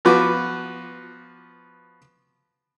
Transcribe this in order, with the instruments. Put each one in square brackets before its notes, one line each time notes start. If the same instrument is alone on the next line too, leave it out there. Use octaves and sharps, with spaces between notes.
[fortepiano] F3 B3 F#4 B4 D6